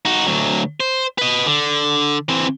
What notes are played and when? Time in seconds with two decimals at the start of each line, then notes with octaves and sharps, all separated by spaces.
0.05 D#4 F#4
0.26 D2 F#3
0.80 C5
1.18 B4 D#5
1.46 D3
2.29 E3 C4